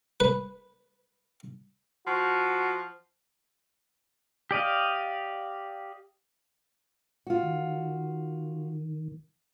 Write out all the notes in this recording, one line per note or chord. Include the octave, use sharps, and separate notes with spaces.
B4
F3 F#4
G4 D5 D#5 F5
F4 F#4
D#3